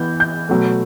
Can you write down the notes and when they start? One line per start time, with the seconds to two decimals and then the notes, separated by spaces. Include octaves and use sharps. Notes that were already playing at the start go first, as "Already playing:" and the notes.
Already playing: E3 B3 G6
0.20 G6
0.49 B2 F#3 A3